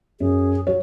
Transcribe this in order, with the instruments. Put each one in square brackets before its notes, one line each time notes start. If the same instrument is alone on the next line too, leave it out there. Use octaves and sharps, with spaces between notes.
[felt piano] F#2 [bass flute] G#4
[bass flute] F#3 [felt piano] C#5